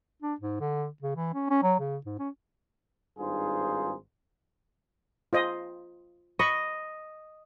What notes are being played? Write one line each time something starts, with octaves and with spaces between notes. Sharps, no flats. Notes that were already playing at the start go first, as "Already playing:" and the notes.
D4
G#2
D3
C#3
E3
C#4
C#4
F#3
C#3
G#2
C#4
G#1 G2 D#4 F4 G#4 C5
F4 C5 D#5
D#5 B5 C#6